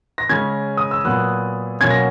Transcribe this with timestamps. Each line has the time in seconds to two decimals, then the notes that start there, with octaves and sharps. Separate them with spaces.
0.18 A#6
0.29 C#3 G#3 C#4 G#6
0.77 D#6
0.91 E6
1.05 A#2 F#3 B3 F#6
1.81 B2 F#3 A#3 C#4 G#6
1.90 A#6